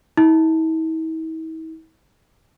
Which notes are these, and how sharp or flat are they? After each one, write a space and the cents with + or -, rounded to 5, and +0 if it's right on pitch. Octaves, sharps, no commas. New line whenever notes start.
E4 -45